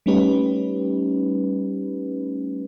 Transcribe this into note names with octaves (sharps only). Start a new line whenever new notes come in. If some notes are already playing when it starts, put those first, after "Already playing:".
G3 A3 C#4 D#4 G4 B4